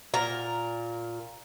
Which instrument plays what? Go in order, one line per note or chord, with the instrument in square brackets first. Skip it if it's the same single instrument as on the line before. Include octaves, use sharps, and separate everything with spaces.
[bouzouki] A#2 A#4 A#5